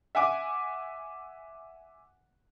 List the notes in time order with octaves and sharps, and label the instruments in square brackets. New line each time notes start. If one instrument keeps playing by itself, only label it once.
[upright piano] E5 F#5 G#5 D6